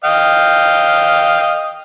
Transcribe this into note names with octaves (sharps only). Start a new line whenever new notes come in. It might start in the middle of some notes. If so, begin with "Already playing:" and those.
D#5 F5 G5